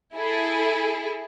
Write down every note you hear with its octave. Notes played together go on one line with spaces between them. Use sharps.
E4 G#4 A4